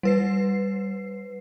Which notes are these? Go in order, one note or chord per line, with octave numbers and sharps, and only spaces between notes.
G3 B4 C7